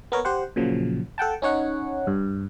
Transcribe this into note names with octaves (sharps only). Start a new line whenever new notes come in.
B3 A#4 C#5
G4 C5 F#5
A#2 C#3 F3 F#3
A4 F#5 G5 A5
C#4 D#4 C#5 F#5
G2